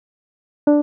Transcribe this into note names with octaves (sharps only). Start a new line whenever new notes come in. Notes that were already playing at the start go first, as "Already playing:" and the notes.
D4